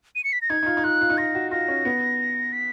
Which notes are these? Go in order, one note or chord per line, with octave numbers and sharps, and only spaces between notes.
D#7
C#7
B6
A#6
D#4 G#6
D#4
F4
D#4
F4 F#6
F4
D#4
F4 A#6
F#4
F4 A#6
C#4
B3
B6